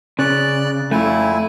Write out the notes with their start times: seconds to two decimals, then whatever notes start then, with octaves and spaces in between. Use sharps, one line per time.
0.19 C#3 D5 F#6
0.91 F2 A3 E4 F4 G#5